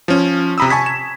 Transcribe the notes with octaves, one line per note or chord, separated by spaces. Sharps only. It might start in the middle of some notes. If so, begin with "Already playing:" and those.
F3 C#4
C3 A#5 B5 D#6 E6
G#5 A5 C#6 G#6 B6
E7